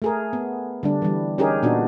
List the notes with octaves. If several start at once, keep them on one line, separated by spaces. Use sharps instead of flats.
A3 G#4 A#4
B3
D3 G3 D4
E3 G3
C#4 D#4 G4 G#4 A#4
A#2 B3 D4 D#4 F#4